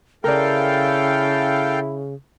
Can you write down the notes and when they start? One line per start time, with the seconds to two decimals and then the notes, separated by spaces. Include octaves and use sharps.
0.24 C#3 E4 A4 A#4 D5 F5 G5